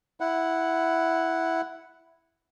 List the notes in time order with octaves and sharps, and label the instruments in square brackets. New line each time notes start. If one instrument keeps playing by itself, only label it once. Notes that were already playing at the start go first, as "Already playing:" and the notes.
[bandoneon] E4 F#5